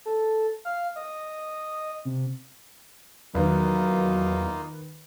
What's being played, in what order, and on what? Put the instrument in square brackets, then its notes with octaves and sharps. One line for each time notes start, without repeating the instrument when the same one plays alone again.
[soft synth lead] A4
F5
D#5
C3
[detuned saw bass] E2 [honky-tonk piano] D#3 B4 [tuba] F#3 [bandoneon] A#3 D#4 F4